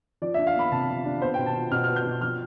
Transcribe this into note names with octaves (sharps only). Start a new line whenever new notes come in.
F3 D5
D4 E5
F5
B3 B5
C3 A5
F3
D4
B3 C5
B2 G5
A5
F4
B2 F6
B3 F6
G6
B2
F3 F6